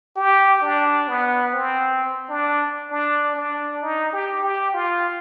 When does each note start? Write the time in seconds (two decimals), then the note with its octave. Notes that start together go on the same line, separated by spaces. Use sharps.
0.16 G4
0.62 D4
1.08 B3
1.53 C4
2.30 D4
2.91 D4
3.36 D4
3.82 D#4
4.13 G4
4.43 G4
4.74 F4